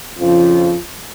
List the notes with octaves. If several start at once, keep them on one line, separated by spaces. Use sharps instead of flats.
F2 C#3 F3